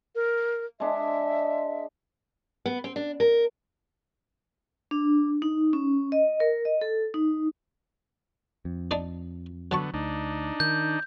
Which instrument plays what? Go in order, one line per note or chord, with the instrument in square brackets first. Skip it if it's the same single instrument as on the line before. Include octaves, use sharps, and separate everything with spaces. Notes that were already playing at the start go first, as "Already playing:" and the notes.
[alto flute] A#4
[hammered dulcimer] G#3 D4 [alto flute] E5
[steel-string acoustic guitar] B3
C4
D4
A#4
[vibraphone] D4
D#4
C#4
D#5
A#4
D#5
A4
D#4
[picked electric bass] F2
[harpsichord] D4 D#4 D5
[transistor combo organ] D3 B3 [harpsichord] F#3 A5 C#6
[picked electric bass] D2 [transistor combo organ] D4 D#4
[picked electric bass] D#3 [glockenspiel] G6